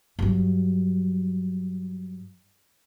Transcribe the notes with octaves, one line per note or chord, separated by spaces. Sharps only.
G2 F#3